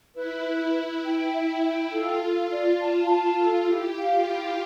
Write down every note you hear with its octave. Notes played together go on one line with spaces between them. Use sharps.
E4 B4
B4
B4
G5
E5
G5
F4 A4
A4
D5
A5
A5
A4
E4 G4
F5
F4
E4